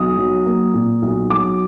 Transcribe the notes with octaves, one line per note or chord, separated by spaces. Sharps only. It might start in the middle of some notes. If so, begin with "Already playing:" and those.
Already playing: B1 D#6
F#3
A#3
A#2
B1
F#3 D6